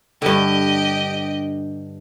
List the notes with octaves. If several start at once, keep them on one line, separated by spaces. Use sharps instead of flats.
G2 D3 G4 D#5